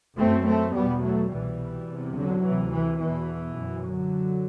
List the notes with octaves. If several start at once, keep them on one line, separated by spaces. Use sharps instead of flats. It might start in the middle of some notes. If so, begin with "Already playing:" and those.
F#2 A3 C4
A3 C4
E2 B2 G3 B3
F#3 A3
C2 B2 E3 G3
E2 C3
D3 F#3
D2 C3 E3
E3
E2 B2 E3
F#2
D3 F#3